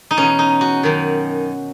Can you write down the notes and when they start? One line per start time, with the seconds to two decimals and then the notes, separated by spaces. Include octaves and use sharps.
0.11 D#4
0.17 E2 B2 C#4
0.39 D#4
0.61 F#4
0.83 F#2 D#3